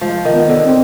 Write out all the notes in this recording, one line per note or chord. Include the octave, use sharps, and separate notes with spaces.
F3 G#3
D#3
B3
D3
C4